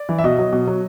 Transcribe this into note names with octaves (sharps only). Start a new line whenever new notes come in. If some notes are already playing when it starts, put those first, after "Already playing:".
Already playing: D5
E3
E5
B2 D#5
F#3
B2
F#3